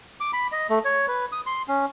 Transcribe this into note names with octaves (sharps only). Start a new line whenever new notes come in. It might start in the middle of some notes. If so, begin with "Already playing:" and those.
D6
B5
D#5
A3
C#5
B4
D#6
C6
C#4